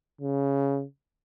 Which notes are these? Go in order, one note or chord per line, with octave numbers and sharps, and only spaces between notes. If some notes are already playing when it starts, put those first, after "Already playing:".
C#3